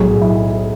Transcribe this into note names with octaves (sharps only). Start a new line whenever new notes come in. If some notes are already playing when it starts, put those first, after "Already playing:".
Already playing: B1 A2 F#3 G#4
E4